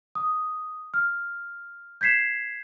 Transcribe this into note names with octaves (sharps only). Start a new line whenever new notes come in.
D#6
F6
G6 G#6 B6 C7 E7